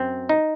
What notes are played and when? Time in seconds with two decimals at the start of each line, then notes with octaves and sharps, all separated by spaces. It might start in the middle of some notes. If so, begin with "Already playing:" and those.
Already playing: F#2 C4
0.29 D#4